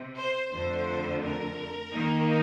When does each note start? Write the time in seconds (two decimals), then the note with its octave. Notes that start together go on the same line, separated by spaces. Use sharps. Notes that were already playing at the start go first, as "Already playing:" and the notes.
Already playing: C3
0.17 C5
0.52 F2 D3 A3 C5
1.23 A#4
1.93 D#3 A#3 D#4